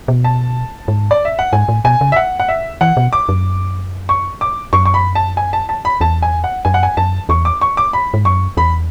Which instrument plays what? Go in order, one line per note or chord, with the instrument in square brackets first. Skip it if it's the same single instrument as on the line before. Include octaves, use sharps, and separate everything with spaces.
[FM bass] B2
[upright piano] A5
[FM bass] G#2
[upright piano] D5
E5
F#5
[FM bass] G#2 [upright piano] G#5
[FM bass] A2
[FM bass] B2 [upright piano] G#5
[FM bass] C#3
[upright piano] E5
F#5
F#5
E5
[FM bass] E3 [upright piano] F#5
[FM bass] B2
[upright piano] D6
[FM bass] F#2
[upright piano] C#6
D6
[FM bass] F#2 [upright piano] C#6
[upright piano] C#6
B5
A5
G#5
A5
A5
B5
[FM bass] E2 [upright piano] A5
[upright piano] G#5
F#5
[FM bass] F#2 [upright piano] G#5
[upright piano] F#5
G#5
[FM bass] F#2 [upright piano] A5
[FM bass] E2 [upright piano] C#6
[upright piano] D6
C#6
D6
B5
[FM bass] G#2
[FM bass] F#2 [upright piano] C#6
[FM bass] E2 [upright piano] B5